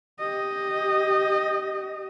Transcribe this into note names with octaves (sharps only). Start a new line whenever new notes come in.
G4 D#5